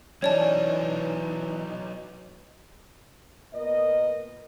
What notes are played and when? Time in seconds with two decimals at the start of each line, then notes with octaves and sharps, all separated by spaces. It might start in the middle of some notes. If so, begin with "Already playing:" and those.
0.22 E3 F#3 C#4 D#4 C#5 D5 A5
3.54 A#2 B3 A#4 D#5